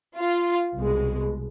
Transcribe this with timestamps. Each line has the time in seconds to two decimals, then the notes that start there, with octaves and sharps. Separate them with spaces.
0.18 F4
0.77 C2 B2 G#3